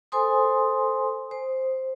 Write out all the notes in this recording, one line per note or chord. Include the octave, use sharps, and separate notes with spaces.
A4 C5 G#5 C6 D#6
C5